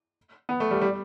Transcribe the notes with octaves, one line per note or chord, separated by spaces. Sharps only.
B3
A3
G3
G3